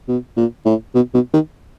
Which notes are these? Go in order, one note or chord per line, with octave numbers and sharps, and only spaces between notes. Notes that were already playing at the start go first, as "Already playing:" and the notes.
B2
A#2
A2
B2
B2
D#3